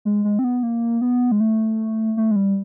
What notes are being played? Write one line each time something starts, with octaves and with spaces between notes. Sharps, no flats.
G#3
G#3
C4
B3
A#3
B3
G#3
A3
A3
G#3
G3